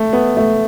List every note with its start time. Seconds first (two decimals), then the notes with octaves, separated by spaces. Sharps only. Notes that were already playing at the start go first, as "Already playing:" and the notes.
Already playing: A3
0.13 B3
0.37 A3